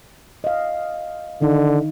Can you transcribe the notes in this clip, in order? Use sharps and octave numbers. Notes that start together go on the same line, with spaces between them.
D#5 F5
D3 D#3 D#4